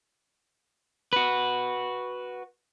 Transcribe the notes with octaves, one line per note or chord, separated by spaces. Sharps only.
F#4 B4